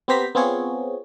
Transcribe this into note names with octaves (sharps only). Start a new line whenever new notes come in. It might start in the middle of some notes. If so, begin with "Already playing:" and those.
B3 C4 G4 C5 A#5 B6
B3 C4 F4 G#4 C#5